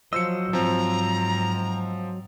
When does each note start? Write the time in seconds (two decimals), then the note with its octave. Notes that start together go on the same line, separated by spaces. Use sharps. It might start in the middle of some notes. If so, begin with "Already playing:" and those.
0.13 F3 F#3 C5 D#5 E6 C#7
0.53 G#2 F3 C4 A#5